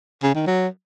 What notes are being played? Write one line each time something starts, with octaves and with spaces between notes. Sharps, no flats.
C#3
D#3
F#3